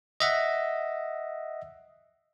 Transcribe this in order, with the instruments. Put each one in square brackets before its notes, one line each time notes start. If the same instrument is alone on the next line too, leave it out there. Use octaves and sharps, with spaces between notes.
[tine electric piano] D#5 E5 F#5